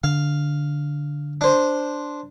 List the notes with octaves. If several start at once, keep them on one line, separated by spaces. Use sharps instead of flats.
D3 F5
D4 C5